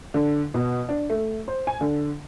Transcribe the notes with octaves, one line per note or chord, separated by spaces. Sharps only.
D3
B2
D4
A3
C5
G#5
D3